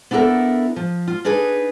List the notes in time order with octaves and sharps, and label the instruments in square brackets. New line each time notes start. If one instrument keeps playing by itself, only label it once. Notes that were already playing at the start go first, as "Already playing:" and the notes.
[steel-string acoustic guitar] B3 D4 E4 G4 A4 A#4
F3
F4
D4 D#4 G#4 B4